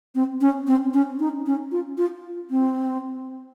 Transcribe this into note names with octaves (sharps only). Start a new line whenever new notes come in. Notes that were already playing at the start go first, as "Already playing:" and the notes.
C4
C#4
C4
C#4
D#4
C#4
F4
F4
C4